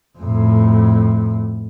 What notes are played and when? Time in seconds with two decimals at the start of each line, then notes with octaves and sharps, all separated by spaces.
0.19 F2 A2